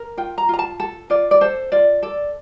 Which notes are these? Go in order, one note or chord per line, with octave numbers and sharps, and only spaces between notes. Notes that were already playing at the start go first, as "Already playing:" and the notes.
Already playing: A#4
F4 G5
A#5
F4 A#5
A5
A4 A5
F4 D5
D5
A4 C5
F4 D5
A4 D5